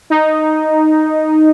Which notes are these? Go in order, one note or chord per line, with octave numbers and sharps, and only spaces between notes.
D#4